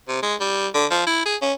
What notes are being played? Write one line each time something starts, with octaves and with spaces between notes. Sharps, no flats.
C3
G#3
G3
D3
F3
E4
G#4
C#4